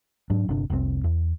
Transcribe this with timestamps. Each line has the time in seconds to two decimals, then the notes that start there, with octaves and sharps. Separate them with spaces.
0.30 G#2 F#3 D4
0.49 G1 C3 D4
0.70 F1 C2 G#2 C4
1.04 E2